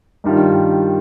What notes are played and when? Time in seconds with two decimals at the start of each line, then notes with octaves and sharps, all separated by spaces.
0.24 G2 D#3 G3 D4 F4